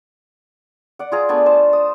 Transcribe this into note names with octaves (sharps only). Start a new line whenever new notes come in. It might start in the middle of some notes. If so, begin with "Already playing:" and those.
D5 F#5
F4 G#4 A#5
A3 B3 D4 G#5
C5 A5
D#6